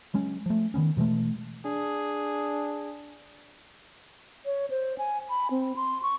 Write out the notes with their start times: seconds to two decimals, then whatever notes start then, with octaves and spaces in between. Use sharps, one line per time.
0.14 F#3 G#3 C#4
0.46 F3 A3
0.74 D#3 F3 B3 C#4
0.97 B2 E3 G#3 A3
1.65 D4 G#4
4.45 C#5
4.70 C5
4.98 G#5
5.30 B5
5.51 C4
5.76 C6
6.03 C#6